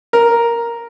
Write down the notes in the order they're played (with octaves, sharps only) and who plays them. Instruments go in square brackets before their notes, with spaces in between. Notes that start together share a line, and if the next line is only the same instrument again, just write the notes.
[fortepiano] A#4